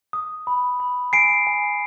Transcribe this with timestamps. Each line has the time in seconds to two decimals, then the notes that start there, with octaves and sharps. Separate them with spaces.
0.13 D#6
0.47 B5
0.80 B5
1.13 G#5 C7 D7
1.47 G#5